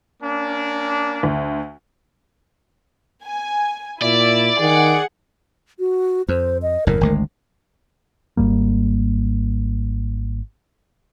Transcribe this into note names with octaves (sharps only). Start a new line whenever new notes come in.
A#3 C#4 D4
D2
G#5
A#2 E4 D5
D#3 G#4 F#5
F#4
F2 C5
D#5
F#1 E2 A2 A#4
G#1 D2 G#3
G#1 G#2 G3 A#3